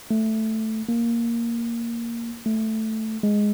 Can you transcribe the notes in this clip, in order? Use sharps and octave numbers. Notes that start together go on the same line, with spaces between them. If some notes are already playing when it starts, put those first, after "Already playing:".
A3
A#3
A3
G#3